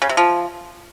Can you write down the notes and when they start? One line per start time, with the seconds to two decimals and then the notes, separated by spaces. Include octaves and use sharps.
0.02 C#3
0.09 C3
0.17 F3